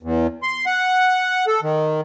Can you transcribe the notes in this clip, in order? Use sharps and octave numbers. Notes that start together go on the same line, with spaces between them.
E2
C6
F#5
A4
D#3